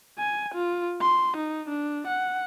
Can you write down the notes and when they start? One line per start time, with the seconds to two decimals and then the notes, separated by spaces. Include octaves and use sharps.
0.18 G#5
0.54 F4
1.01 C6
1.36 D#4
1.69 D4
2.07 F#5